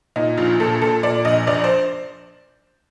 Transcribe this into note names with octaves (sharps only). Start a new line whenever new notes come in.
A#2 D#4
A#1 F4
A#2 A4
A#2 A4
A#2 D5
A#1 D#5
A#1 D5
C5